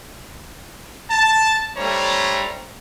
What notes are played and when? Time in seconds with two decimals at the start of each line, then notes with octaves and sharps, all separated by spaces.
1.10 A5
1.77 G3 A3 D4 C5 C#5 A#5